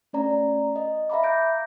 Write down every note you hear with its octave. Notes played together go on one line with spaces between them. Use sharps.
A3 C#4 D5 A#5
D#5
E5 F5 A#5 B5 D6
G6 A#6 D7